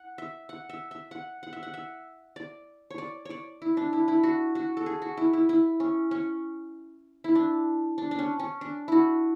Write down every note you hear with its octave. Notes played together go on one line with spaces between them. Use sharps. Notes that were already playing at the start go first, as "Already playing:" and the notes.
Already playing: F#5
E5
F#5
E5
E5
F#5
F#5
E5
F#5
E5
D5
C#5
D5
C#5 D5
E4
D4
E4
E4
F#4
F#4
A4
G#4
F#4
E4
E4
E4
C#4
C#4
E4
D4
D4
D4
C#4
C#4
D4
E4 F#4